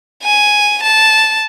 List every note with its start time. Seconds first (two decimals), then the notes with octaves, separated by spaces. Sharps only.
0.24 G#5
0.83 A5